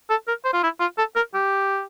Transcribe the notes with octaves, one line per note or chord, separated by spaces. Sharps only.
A4
A#4
C5
F4
E4
F4
A4
A#4
G4